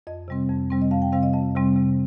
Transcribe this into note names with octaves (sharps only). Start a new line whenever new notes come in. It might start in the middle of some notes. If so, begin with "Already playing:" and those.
F2 D#5
C3 G3 C4
F2
C3 G3 C4
D#5
F2 F5
G5
C3 G3 C4 F5
D#5
F2 D#5
C3 G3 C4
C3